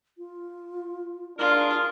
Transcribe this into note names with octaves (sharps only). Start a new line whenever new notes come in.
F4
D4 F4 G#4 A#4